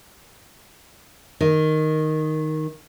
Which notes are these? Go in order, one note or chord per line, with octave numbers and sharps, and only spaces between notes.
D#3